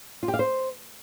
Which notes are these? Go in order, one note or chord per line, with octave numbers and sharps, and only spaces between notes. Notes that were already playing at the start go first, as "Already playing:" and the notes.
F4
G4
F5
C5